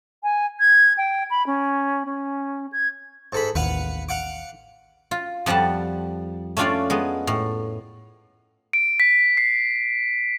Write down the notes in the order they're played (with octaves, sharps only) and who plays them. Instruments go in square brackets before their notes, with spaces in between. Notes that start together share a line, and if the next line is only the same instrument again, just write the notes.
[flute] G#5
G#6
G5
B5
C#4
C#4
G#6
[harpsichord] G#2 A4 B5
[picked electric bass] A1 D#2 [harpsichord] B4 F5 F#5
[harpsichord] F5 F#5 D6
[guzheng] F4
F2 F3 G3 F#5 A5
A3 C#4 D4 F4 D5 F5
G#3 B3
A2
[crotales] D7
B6
C7